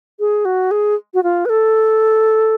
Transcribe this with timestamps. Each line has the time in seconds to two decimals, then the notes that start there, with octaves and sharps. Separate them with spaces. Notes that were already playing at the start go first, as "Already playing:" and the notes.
0.20 G#4
0.45 F#4
0.71 G#4
1.14 F#4
1.23 F4
1.45 B4
1.49 A4